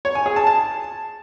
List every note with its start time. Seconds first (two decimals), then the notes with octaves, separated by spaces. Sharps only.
0.05 C#5
0.15 G#5
0.26 G#4
0.36 A5
0.47 A5